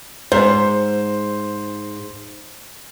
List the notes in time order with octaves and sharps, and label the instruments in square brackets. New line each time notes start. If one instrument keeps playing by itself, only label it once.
[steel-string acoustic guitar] G#2 [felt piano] C5